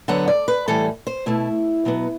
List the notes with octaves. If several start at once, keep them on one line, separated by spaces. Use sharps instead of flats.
D3 F#3 B3 F#5
D5
B4
A2 E3 G3 A4
C5
B2 A3 E4
B2 F#3 B3